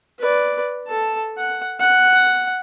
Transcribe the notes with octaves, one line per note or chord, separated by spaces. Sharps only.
B4 D5
A4 A5
F#5
F#5